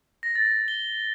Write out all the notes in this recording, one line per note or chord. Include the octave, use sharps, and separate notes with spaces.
A#6
A6
G7